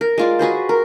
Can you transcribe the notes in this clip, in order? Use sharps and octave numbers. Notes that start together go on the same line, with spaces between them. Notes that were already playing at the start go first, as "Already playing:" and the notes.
A#4
G#3 F4 D5
F#4 G#4 B4 C5
A#4